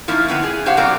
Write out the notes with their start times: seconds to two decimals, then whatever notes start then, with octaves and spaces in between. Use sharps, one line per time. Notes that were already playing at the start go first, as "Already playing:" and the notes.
0.08 F3 A#3 C#4 D#4 E4
0.28 D3 B3 C4 E4
0.43 G#4
0.66 C#4 G4 C5 F5 F#5
0.77 B2 F#3 C4 A#4 D5 F#5